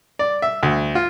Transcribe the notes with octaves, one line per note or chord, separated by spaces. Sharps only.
D5
E5
D2
F4